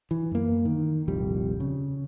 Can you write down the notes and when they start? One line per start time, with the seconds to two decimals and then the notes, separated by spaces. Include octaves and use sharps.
0.11 E3
0.31 F#2 A#3
0.65 D#3
1.08 D#1 C2 F2 G3
1.60 C#3